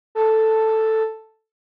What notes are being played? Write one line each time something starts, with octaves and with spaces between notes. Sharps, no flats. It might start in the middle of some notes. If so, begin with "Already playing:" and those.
A4